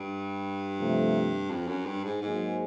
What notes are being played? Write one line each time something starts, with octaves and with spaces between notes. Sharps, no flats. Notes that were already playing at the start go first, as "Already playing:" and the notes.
Already playing: G2
C3 F3 A3
F2
F#2
G2
G#2
G#2 F#3 A#3 D#4 G#4 C5